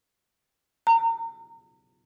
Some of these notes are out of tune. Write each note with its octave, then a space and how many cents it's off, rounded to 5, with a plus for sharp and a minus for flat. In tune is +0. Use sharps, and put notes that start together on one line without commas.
A#5 -35